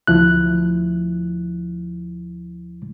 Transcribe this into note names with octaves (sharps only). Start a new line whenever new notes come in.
D2 F3 E4 F#6